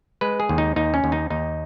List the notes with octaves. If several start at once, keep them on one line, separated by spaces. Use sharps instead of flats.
G#3 B4
G#4
D#2
D#4
D#2 D#4
C#4
D#2
D#4
D#2 D#4